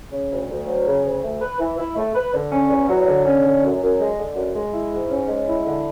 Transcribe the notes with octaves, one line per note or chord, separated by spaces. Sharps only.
C#3
D2
D2
F#3
C#3
D2
A3
B4
E3
E4
A3
B4
D3
C#4
E2
F#3
D3
C#4
D3
F#2
F#2
G#3
D3
F#2
G#3
E4
G#2
C#4
G#3
E4
D3